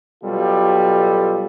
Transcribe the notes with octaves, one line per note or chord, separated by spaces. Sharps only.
B2 F#3 G3 F4 G4 A4